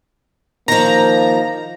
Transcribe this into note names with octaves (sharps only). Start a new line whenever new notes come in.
D#3 F3 A#3 A#5